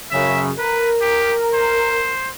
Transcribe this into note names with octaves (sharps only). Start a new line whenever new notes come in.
F#2 C#3 E5
A#4 B4
G4
C5